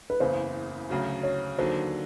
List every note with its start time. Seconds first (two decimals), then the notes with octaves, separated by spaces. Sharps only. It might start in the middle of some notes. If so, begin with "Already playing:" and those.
0.10 B4
0.20 F#1 E2 C#3 C5
0.89 D2 C#3 F#3
1.23 C#5
1.58 D#2 D3 F#3 C5